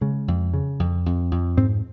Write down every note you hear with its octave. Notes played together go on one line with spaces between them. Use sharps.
C#3 G#3
F2
C#3
F2
F2
F2
G#2 C4